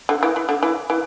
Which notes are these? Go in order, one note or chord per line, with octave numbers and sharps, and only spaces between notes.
D3
E3
E3
D3
E3
E3